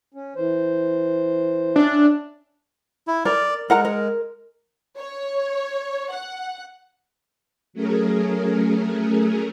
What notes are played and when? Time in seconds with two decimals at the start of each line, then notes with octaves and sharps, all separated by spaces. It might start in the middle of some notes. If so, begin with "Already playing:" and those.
0.14 C#4
0.36 E3 C5
1.76 C#4 D4 E5
3.07 E4
3.25 A#4 D5
3.70 G#3 A#4 F#5 A#5
3.85 A#4
4.98 C#5
6.13 F#5
7.73 F#3 A3 C#4 G#4 A#4